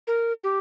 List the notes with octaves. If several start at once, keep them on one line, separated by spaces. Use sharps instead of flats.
A#4
G4